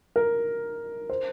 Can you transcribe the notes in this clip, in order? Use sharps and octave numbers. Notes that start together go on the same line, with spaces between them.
A#4
C5